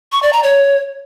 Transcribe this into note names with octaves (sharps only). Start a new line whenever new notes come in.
C#6
D5
A#5
C#5